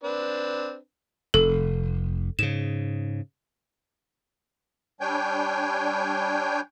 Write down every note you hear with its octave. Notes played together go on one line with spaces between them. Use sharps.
C4 D4 B4
F1 A4
G#2 C#3 E7
G3 D4 C#5 G5 G#5 G6